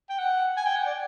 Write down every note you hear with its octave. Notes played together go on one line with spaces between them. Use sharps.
G5
F#5
G#5
G5
F#5
D5